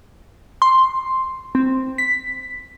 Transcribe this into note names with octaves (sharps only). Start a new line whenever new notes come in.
C6
C4
B6